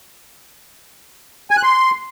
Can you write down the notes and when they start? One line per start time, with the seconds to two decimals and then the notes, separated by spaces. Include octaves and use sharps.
1.51 G#5
1.57 F#6
1.63 C6